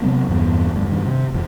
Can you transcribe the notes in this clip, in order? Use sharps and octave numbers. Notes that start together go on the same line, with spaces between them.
C3 F#3 B3 C4
E2 G2 A#3 B3
D2 G2
G2 D#3
C3
E1 F2